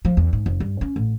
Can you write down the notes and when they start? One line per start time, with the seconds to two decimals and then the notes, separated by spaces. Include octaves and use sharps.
0.05 F3
0.17 E2
0.33 G#2
0.46 F1
0.60 G2
0.81 C#4
0.96 A1